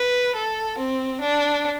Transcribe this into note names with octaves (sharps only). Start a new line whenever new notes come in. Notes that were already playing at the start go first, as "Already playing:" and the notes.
Already playing: B4
A4
C4
D4